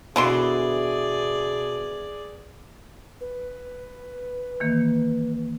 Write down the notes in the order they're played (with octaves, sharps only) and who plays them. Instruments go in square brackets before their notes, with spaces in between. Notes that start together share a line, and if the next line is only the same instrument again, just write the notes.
[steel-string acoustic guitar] B2 [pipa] D3 E3 C6 [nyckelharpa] G#4 D5
[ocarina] B4
[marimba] D#3 E3 A#3